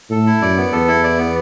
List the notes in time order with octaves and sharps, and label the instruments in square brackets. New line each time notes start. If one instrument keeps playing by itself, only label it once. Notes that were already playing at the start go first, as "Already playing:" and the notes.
[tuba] A2 [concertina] A4
[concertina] E4
[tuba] F#2 [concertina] D5
[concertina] B3
[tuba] E2 [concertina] A4
[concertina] E4
D5
B3